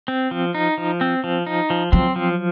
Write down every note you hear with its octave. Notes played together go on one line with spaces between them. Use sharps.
C4
F3
D#4
F3
C4
F3
D#4
F3
F#3 C4
F3